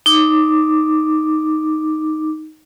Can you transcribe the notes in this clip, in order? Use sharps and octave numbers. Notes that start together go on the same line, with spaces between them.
D#4 D6